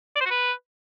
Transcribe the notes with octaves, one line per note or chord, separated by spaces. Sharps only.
D5
C5
F#4
B4